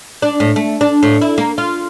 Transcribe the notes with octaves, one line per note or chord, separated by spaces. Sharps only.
D4
A2
A3
D4
A2
E4
A#3
F4